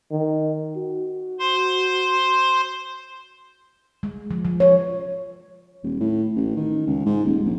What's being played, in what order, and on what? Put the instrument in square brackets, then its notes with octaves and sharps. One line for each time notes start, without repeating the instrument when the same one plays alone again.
[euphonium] D#3
F#4
[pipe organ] C5 C6
[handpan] G#3
F3
F3
C#5
[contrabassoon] D#1
A2
A1
D#3
C#2
G#2
D#1
A#1